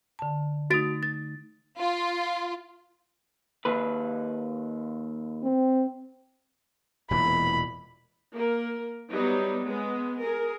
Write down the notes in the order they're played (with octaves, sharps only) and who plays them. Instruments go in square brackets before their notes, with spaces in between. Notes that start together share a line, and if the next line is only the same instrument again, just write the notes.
[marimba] D3 A5
[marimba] A3 D#4 [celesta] F#4 A6 D7
[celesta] A6
[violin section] F4
[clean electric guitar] D#2 B4
[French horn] C4
[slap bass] E1 A#2 E3 [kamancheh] B5
[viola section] A#3 A#4
F#3 G3 B3 D#4
G#3 B3
G#4 A#4